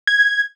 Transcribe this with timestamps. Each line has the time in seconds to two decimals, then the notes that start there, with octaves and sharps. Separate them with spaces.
0.07 G#6